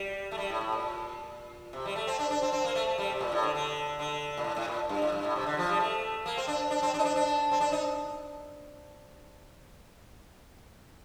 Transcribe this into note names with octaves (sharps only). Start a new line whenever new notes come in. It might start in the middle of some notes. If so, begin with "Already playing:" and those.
Already playing: G3
A3
G3
A2
A2
A#2
C3
G3
A3
C4
D4
D4
C4
C4
A#3
A3
A3
G3
C3
A#2
A2
D3
D3
D3
A#2
A2
A2
A#2
G2
A2
G2
A2
C3
D3
F3
G3
A3
A#3
C4
D4
D4
C4
D4
D#4
D4
D4
C4
D4
D#4